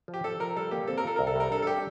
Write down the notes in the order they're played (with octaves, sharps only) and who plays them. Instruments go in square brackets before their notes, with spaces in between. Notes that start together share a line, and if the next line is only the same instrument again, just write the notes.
[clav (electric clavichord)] F3
[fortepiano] G4
[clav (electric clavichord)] F3 [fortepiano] A4
[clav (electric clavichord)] F3 [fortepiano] A#4
[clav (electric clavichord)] G3 [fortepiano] A4
[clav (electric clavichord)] A#3 [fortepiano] G4
[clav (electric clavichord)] C4 [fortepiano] A4
[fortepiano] A#4
[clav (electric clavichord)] F4 [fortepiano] A4
[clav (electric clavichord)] C2 [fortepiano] A#4
[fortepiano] A4
[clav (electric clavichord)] G3 [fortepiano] A#4
[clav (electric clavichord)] D4 [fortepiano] A4
[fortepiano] A4
[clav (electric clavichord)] G3 [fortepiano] G4